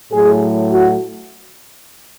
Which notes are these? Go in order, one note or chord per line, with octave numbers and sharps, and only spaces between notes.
A2 F#3 A3 G#4
F#4